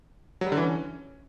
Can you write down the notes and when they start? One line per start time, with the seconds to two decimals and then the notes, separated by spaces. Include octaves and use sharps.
0.41 F#3
0.47 G3
0.52 D3
0.57 E3
0.62 C#4